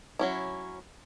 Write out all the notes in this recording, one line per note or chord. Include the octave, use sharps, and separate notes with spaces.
F#3 C#4 E4